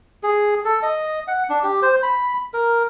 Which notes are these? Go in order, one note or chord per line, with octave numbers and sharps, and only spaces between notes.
G#4
A4
D#5
F#5
D4
G4
C5
B5
A#4